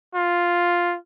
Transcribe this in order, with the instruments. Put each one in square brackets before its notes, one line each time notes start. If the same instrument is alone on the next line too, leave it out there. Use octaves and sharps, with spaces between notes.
[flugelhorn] F4